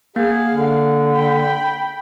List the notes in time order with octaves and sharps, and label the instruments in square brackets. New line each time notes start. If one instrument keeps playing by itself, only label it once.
[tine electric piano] A#3 [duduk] G#4 [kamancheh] F5 F#5
[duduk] D3
[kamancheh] G5 B5